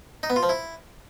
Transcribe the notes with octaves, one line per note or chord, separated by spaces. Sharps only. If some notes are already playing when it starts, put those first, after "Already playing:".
D#4
B3
F4
F3
E4